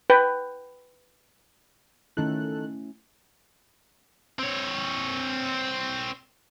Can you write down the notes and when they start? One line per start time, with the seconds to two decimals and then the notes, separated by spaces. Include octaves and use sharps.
0.10 B4 G5
2.17 D#3 A3 C#4 E4 A4 F#6
4.39 C4 C#5